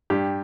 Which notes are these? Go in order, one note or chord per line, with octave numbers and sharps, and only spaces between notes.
G2 G4